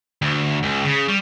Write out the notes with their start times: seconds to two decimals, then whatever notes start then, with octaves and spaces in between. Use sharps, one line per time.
0.22 D2
0.63 C#2
0.84 C#3
1.08 G3